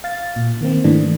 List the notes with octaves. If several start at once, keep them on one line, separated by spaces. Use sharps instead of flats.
F5 A6
A#2
D#3 A#3 C4
G#2 D#3 E3 A3 D4